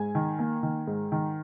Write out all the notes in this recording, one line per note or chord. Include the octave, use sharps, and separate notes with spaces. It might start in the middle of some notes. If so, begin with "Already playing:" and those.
Already playing: G#2 G#5
D#3
A#3
D#3
G#2
D#3